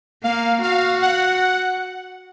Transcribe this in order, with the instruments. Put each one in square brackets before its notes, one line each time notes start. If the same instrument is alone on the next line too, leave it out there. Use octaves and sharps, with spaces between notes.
[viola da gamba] A#3 [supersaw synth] F5
[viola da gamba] F#4 [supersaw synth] F5
[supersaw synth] F#5